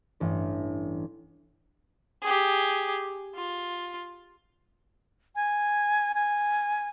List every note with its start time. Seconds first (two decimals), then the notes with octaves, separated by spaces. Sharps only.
0.20 A1 G2
2.23 G4 G#4
3.35 F4
5.36 G#5
6.15 G#5